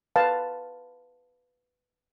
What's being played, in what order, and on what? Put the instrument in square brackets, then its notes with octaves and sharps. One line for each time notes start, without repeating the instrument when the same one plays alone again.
[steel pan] B4 F5 A5